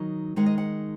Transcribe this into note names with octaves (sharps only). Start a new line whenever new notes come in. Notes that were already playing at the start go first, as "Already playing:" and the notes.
Already playing: D#3 F#3 D#4
D#3 G#3 D#4 F#5
D#5
F#5